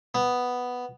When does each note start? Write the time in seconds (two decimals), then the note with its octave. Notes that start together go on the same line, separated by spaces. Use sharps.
0.15 B3